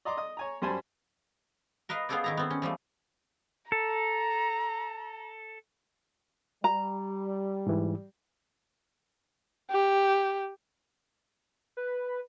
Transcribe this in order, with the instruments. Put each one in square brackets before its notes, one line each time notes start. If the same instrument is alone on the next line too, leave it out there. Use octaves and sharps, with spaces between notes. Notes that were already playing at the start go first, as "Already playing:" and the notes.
[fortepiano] D5 D#5 A#5 C6 D6
D#5 D#6
C#5 G#5 A#5
F#2 G3 C5 G#5 A5 B5
[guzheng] A#4 B4 D#5 F5
B3 F4 G#4 A4 C5 D5
D#3 E4 A#5
B3 C4
C#4
E3 F3 G3 A3
[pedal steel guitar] A4 [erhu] A#5
[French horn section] G3 [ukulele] A#5
[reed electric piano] G#2 E3
[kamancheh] G4
[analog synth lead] B4